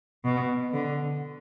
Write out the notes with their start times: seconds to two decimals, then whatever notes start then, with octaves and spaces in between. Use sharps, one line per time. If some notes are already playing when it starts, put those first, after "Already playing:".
0.25 B2
0.73 D3